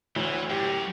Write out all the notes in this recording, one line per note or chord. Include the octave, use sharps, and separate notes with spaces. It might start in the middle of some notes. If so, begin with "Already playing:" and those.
D2 A2 E3 F#3
F#2 G4